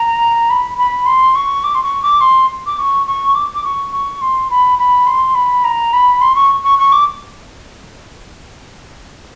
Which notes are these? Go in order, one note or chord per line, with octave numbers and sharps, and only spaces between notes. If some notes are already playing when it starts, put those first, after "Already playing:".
Already playing: A#5
B5
B5
C6
C#6
D6
C6
C#6
D6
C6
D6
C#6
C#6
D6
D6
C#6
C#6
C6
B5
B5
C6
B5
A#5
B5
C6
C#6
C#6
C#6
D6